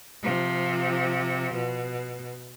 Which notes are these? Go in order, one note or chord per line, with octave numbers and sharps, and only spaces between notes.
C3 F3
B2